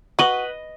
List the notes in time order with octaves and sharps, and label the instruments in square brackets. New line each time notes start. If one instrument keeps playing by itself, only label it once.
[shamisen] F#4 [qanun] B4 D#5